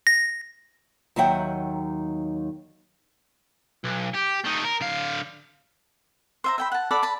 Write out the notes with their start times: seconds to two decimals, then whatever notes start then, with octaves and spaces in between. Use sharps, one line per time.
0.07 A#6
1.16 D#2 D#3 F#3 E5 F#5 G5
3.84 B1
4.15 G4
4.45 A3 D#4
4.65 A#4
4.81 D3 F5
6.44 C5 E5 A#5
6.58 E5 G5 B5
6.72 F#5 A5
6.91 A4 D5 F#5 B5
7.03 A5 B5